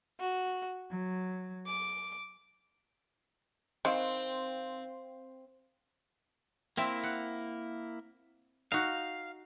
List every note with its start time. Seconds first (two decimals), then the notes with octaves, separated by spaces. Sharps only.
0.19 F#4
0.90 F#3
1.66 D6
3.85 D#3 C4 F5 C6
6.77 A#3 C4 E4 E5
7.03 F#5
8.72 D#4 F#4 F5